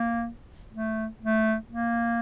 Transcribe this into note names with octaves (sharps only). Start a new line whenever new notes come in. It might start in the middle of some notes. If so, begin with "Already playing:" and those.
Already playing: A#3
A3
A3
A#3